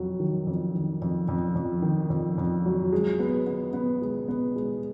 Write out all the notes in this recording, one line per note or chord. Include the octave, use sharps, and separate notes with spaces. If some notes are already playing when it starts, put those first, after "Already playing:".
Already playing: F2 F#3
D#3
F2
D#3
F2
F2
F2
D#3
F2
F2
F#3
G#3
B3
B3
B3
G#3
B3
G#3